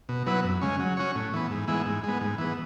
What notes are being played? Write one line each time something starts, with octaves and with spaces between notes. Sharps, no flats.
B2
F#3 B3 E4 B4
F#2
C#3 G#3 C#4
F#3
C#4 F#4 C#5
A2
E3 B3
G#2
E3 G#3 B3 E4
G#2
G#3 B3
G#2
E3 B3